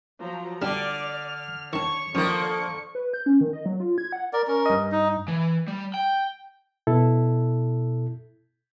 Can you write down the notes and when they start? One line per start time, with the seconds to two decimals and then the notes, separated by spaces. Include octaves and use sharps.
0.20 F3 F#3 A#5
0.62 D3 G3 D4 D5 F6
1.73 D#3 D4 C#5 C#6
2.15 D3 D#3 F3 A#3 C#4
2.95 B4
3.14 G6
3.26 C#4
3.41 D#3
3.53 D#5
3.66 F#3
3.80 F4
3.98 G#6
4.13 F#5
4.33 A#4 D5
4.48 C#4 A#4
4.66 G2 D#5
4.92 D#4
5.28 E3
5.68 G3
5.94 G5
6.87 B2 E4 A4